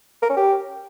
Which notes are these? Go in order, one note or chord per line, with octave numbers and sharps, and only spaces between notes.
A#4
C#4
G4